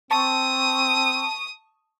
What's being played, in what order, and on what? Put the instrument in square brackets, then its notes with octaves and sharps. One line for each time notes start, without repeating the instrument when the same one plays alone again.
[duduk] C4 [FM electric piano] A5 C#6 [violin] D#6